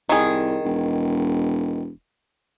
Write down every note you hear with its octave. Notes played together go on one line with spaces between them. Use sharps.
C2 D#3 G#4
E1